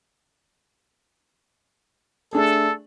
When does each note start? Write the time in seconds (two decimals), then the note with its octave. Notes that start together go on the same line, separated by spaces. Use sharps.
2.33 A3 D4 G#4 A4